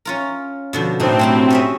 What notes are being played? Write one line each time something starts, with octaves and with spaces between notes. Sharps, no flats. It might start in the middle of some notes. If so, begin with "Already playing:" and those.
C#4 F4 A#4
B2 D3 F3
A2 C4 D4 D#4
F#3 E4 G4
C#4 D#5 E5